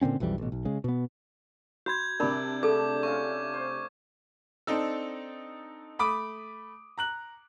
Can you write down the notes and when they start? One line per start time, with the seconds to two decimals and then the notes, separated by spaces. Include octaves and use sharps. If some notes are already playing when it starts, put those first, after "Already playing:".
0.01 A#2 D3 C4 C#4
0.20 B1 F2 E3 G3
0.38 A1 B2
0.52 B1
0.65 C#3 G#3
0.84 B2 B3
1.86 F#4 B5 G6 G#6
2.20 C3 G3 D4 A#4 B5 D6
2.63 D3 A3 G#4 A4 A5 D6
3.03 A3 C#4 F4 C#6
3.54 C5
4.67 C4 D4 D#4 A4
5.99 A3 B5 D6 D#6
6.98 A#5 F#6 F#7